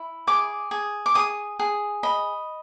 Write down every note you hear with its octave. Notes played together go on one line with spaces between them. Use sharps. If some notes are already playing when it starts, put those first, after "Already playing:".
Already playing: E4
G#4 D6
G#4
D6
G#4 D#6
G#4
D#5 B5